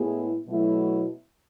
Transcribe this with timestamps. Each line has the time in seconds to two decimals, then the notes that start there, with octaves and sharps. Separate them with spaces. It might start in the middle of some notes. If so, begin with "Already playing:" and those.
Already playing: A2 G#3 B3 E4 G#4
0.48 B2 F#3 A3 E4